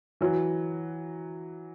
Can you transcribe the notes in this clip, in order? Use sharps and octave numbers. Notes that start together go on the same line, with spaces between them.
E3 F#3